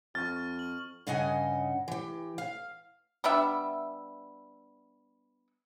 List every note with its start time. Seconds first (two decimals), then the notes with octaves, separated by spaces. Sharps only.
0.15 F2 C#6 F6 A6
0.59 F#7
1.07 G2 C#3 D#5 F#5 G#5
1.88 E3 G4
2.38 F5
3.24 G3 B3 D4 E5